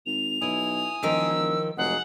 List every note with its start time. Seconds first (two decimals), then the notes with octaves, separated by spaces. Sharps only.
0.06 G#1 F7
0.42 B1 E4 G#5 D#6
1.03 E1 D#3 F3 A#4 E6
1.77 F1 F#3 G#3 G#4 F#5